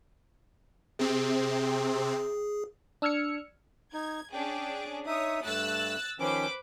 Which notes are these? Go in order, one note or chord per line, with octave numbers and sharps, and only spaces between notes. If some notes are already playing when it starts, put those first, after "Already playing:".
C3 C4 G#4
D4 E6 F6 G#6 C#7
D#4 G#6
C#4 D4 G#4 G5
D#4 C#5 E5 D#6
G2 A3 E6 F#6 A6
D#3 F3 C#4 B4 C5 D6